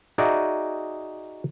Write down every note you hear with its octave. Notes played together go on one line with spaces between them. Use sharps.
D#4 F#4 G#4 D5 E5